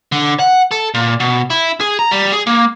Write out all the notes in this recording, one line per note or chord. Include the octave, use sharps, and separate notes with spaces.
D3
F#5
A4
A#2
B2
E4
G#4
A#5
G3
G#4
A#3